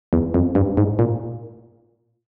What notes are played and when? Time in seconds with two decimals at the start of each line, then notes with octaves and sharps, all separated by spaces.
0.13 E2
0.34 F2
0.55 G2
0.77 G#2
0.99 A#2